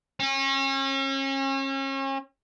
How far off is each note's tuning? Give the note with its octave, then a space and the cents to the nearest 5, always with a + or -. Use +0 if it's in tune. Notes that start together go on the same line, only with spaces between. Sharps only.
C#4 -35